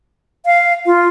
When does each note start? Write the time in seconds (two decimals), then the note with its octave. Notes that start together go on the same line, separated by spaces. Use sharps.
0.46 F5
0.86 F4